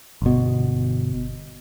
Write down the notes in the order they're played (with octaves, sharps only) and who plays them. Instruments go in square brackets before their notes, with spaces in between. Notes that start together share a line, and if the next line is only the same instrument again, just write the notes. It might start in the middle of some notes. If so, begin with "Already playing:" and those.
[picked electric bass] G1 B2